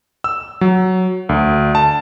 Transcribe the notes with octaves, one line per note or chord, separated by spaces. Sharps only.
E6
F#3
D2
A5